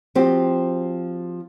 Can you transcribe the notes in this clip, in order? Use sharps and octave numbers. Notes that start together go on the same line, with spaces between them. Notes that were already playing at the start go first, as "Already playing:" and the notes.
F3 C4 F#4 G4